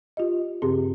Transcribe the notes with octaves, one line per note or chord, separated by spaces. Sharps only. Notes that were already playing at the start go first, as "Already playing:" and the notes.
F4 G4 D#5
G2 C#3 C4 G4 G#4 C6